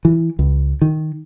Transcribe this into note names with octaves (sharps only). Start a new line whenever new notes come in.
E3
C#2
D#3